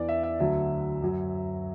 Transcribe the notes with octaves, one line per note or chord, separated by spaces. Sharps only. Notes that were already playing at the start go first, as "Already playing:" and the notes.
Already playing: E2 E3 D5
E5
E5
D2 D3 F#3 E5
F#2 F#3